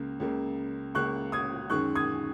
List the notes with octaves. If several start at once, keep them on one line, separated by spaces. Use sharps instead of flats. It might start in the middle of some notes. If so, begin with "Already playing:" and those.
Already playing: C#2 C#3 A#3
C#2 C#3 A#3
C#2 C#3 A#3 C#6 F#6
D#6 G#6
F#2 D#3 G#3 C#6 F#6
D#6 G#6